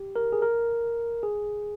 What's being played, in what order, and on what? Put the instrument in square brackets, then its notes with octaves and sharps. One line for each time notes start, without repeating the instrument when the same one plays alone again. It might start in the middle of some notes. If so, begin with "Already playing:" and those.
Already playing: [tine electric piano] G4
A#4
G#4
A#4
G#4